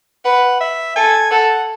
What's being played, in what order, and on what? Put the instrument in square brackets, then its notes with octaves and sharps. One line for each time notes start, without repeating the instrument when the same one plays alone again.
[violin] B4 [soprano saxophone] F#5
[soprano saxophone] E5
[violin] A4 [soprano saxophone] G#5
[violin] A4 [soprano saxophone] F#5